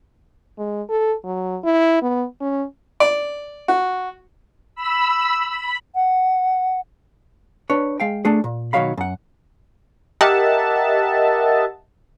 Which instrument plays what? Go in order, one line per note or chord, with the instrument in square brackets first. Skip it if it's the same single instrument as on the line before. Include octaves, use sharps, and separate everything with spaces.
[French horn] G#3
A4
F#3
E4
B3
C#4
[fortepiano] D5
F#4
[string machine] B5 E6
B5
[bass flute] F#5
[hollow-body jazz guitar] D4 B4 C#5
G#3 F5 G5
A3 D4 G#4
A#2
B1 D#3 F#3 C#5 F5 B5
F#2 F#5
[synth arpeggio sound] G4 A#4 D#5 E5 F#5 A5